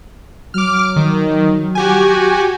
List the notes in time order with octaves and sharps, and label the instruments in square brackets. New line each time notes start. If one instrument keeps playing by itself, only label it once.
[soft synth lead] F#3 [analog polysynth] D6 F6
[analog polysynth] D#3
F#4 G4 G#5